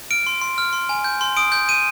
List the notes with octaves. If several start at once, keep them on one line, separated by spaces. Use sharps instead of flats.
F6 D7
C6
C6
F6
C6
G#5
G6
C6
D#6 D7
G6
G6 D#7